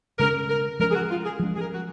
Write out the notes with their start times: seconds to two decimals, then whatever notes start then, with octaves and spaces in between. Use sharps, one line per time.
0.19 C#3 G#3 C#4 A#4
0.49 A#4
0.80 F3 G#3 C#4 A#4
0.90 G#4
0.94 F#4
1.10 F4
1.25 G#4
1.40 F3 G#3 C#4
1.55 G#4
1.60 A#4
1.74 F#4